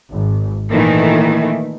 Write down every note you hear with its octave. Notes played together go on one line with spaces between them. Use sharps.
G#1
A#2 D#3 E3 A3